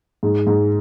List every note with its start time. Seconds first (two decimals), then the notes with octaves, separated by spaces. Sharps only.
0.23 G#2
0.47 G#2